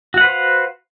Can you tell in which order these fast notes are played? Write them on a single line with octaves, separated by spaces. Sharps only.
F#4 F#5 B4 C5 F5